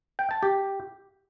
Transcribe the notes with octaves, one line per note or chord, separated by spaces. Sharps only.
G5
A5
G4